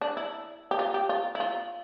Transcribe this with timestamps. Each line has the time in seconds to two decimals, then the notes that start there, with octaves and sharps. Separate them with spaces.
0.01 D4
0.17 E4
0.71 G4
0.79 F4
0.94 G4
1.09 F4
1.35 E4
1.40 F4